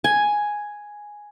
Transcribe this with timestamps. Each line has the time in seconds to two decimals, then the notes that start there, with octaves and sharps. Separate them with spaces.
0.04 G#5